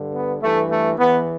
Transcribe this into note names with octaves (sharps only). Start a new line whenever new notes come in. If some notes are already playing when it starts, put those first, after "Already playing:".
Already playing: G2 D3
B3
G2 E3 A3
A3
E2 E3 B3